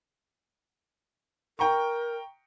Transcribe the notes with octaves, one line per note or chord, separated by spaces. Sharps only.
A#4 G5 A#5 C#6